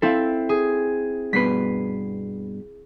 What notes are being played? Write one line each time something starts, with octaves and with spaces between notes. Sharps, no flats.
C4 E4 A4 F5
G#4
G2 B2 B4 B6 C7